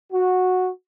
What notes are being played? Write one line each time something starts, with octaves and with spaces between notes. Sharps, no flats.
F#4